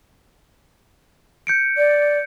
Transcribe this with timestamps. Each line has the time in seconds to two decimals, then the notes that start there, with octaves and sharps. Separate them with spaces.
1.47 G6 C#7 D7
1.77 D5